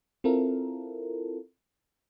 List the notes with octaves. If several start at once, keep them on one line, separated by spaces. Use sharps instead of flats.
C4 E4 F4 A4 A#4